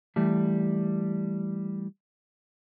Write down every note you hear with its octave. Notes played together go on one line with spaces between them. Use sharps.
E3 G3 A3